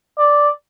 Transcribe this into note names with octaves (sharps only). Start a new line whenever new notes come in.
D5